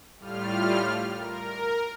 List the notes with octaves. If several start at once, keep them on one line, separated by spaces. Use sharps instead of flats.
A2 G3 F4 F6
A#4